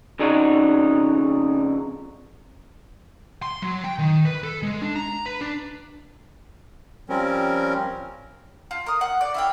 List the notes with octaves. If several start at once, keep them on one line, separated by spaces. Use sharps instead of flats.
F2 C#3 D4 D#4 F#4
C6
F#3
G5
D#3
B4
A4
G#3
D4
A#5
B4
D4
F3 G3 C4 C#4 A#4
F4
A#4 D#6
F#5
D5
E4 F5 G5